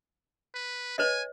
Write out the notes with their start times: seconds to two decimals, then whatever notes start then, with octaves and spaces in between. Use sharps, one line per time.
0.55 B4
0.98 B4 C#5 D#5 G#5